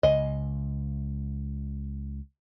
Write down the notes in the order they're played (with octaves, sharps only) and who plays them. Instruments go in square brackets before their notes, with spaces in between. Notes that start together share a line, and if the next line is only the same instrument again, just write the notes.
[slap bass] C#2 [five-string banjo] D#5 G#5